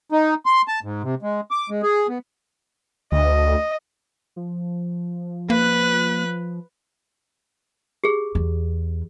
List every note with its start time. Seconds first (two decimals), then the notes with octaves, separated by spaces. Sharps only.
0.12 D#4
0.46 C6
0.68 A5
0.84 G#2
1.03 C3
1.22 G#3
1.51 D6
1.70 G#3
1.83 G#4
2.09 B3
3.12 D2 D#5
4.36 F3
5.50 A#3 B4 F#6
8.04 G4 G#4
8.35 E2